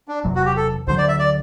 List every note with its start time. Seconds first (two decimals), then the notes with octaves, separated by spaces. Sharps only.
0.08 D4
0.24 E1 E2 C3 F#3
0.35 F#4
0.45 G4
0.56 A4
0.87 D2 D3 F#3 C5
0.98 D5
1.08 E5
1.19 D5